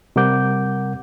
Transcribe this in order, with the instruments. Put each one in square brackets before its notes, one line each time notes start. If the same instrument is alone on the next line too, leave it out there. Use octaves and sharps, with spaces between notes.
[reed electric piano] C3 G3 A#4 F#5 D6 G6